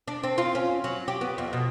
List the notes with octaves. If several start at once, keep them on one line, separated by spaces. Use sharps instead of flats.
D4
C4
F4
C#4
F#3
G4
B3
F2
B2